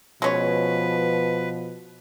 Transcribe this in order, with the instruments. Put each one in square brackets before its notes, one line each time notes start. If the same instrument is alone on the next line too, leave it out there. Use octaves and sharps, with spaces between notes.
[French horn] B2 [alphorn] F3 [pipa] G#3 C#4 C#5 [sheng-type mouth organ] B4